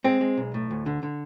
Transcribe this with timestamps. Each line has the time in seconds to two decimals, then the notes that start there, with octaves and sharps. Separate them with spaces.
0.04 G#3 C4
0.21 G#3
0.37 B1
0.54 A2
0.71 D2
0.86 D3
1.03 D3